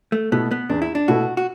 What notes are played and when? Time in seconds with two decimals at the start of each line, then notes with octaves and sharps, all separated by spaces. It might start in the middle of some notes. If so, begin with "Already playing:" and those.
0.12 A3
0.32 B2 A3 B3 E4 A4
0.51 B3
0.69 E2 D4
0.82 E4
0.95 D4
1.08 B2 A3 E4 F#4 A4
1.37 F#4